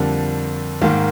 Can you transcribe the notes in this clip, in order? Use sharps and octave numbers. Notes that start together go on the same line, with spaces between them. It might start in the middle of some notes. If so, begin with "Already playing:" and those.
Already playing: F2 D3 G3 A#3
G#2 D#3 A#3